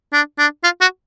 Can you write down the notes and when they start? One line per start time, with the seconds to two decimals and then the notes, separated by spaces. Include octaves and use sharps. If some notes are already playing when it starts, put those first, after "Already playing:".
0.13 D4
0.39 D4
0.64 F4
0.81 F#4